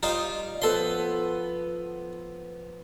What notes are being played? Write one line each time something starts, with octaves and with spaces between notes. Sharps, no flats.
G3 D#4 F4 C5
F3 B3 A4 C6